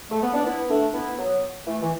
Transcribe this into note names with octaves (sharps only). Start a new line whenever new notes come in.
A3
B3
D4
B3 E4
A3 D4
B3 E4
F#3 B3
E3 A3
E3